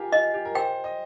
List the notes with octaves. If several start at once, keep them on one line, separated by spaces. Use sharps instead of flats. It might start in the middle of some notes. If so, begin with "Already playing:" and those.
Already playing: F4 G4 G#4 A#4
F4 D#5
G4
A#4
C5 G5
D#5